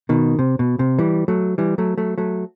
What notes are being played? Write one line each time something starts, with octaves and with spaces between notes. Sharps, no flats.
B2 D#3
C3
B2
C3
E3 G3
F#3 A3
E3 G3
F#3 A3
F#3 A3
F#3 A3